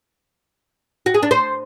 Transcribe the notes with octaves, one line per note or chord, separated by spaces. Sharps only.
F#4
G#4
D4
C5